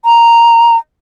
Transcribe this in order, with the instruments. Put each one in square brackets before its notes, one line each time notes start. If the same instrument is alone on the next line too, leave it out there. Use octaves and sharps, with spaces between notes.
[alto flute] A#5